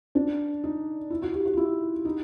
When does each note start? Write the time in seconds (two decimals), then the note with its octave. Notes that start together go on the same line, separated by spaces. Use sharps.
0.15 D4
0.64 D#4
1.10 E4
1.22 F#4
1.34 G4
1.45 F#4
1.53 F4
1.57 E4
2.05 D#4